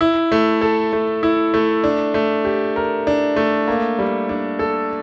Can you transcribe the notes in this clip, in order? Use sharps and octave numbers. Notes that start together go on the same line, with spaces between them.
E4
A3
A4
A3
E4
A3
D4
A3
G4
A#4
D4
A3
A#3
G3
D4
A4